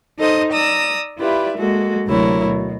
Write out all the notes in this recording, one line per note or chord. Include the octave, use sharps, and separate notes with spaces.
D#4 A4 C5 D#5 D#6
D5 A#5 D#6 E6
E4 F4 G4 B4 D5 E5
G#3 A#3 F#4 A4
D2 C3 F#3 E4 A#4 C#5
B2